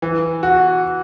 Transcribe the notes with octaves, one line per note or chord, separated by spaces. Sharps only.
E3
F#4